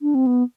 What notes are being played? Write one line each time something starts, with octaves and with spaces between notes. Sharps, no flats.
D4
C4
B3